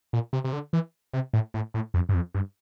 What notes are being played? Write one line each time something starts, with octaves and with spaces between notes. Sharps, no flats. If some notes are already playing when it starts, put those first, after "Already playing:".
A#2
C3
C3
D3
E3
C3
A2
A2
A2
F2
G2
F2
G2